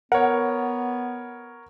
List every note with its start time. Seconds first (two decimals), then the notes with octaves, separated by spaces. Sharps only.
0.12 B3 A#4 C#5 F#5